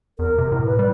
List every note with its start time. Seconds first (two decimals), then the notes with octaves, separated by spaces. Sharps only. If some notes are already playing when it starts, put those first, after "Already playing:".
0.19 E2 A#4
0.38 C3
0.52 A2
0.66 B4
0.79 G3